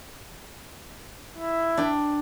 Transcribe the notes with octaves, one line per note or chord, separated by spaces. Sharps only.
E4
D4 G5